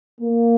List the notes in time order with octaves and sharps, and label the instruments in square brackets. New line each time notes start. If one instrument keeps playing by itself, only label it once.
[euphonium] A#3